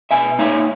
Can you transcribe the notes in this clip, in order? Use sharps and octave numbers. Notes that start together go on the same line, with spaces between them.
B2 E5 G#5
A#3 D#4 C#5 E5